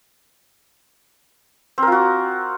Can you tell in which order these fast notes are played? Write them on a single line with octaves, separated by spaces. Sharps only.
C4 A#4 F4 F#4